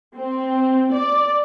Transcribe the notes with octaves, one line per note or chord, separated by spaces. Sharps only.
C4
D5